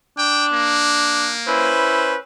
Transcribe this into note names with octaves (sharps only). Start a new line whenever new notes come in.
D4 G5
A#3
C#4 E4 B4 C5